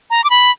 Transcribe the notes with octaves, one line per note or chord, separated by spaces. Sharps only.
A#5
D6
B5